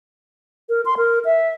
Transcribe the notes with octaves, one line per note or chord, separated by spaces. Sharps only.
A#4
C6
A#4
E5